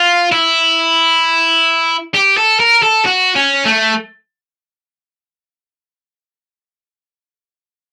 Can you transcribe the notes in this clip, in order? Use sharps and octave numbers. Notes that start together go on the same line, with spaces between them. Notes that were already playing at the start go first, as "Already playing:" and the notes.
Already playing: F4
E4
G4
A4
A#4
A4
F#4
C#4
A3